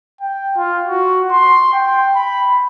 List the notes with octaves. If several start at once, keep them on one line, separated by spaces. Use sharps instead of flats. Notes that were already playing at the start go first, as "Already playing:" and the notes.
G5
F4
F#4
C6
G5
B5